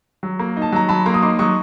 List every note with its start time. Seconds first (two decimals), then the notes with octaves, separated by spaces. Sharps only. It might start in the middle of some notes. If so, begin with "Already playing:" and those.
0.23 F#3
0.40 A#3
0.57 D#4
0.62 A5
0.72 F#3 A#5
0.89 F#3 A5 B5
1.06 A#3 A#5 C6
1.14 D#6
1.22 D#4 C6 D6
1.39 F#3 C#6 D#6